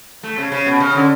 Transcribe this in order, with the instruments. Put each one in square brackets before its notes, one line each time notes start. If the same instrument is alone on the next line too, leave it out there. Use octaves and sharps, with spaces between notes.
[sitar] A3
C#3
C#3
B2
C#3
D3